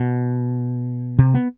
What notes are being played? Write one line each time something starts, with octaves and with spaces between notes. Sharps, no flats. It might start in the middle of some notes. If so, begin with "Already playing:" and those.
Already playing: B2
C3
B3